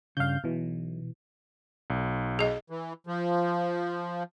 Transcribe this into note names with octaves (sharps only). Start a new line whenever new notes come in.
G2 C#3 F5 G6
B1 B2 E3
B1
G#4 D#5
E3
F3